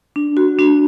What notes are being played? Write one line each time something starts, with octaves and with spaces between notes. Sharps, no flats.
D4
F#4
D4